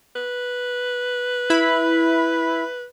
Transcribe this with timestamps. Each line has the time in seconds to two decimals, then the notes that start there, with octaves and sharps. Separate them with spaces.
0.16 B4
1.50 E4 B5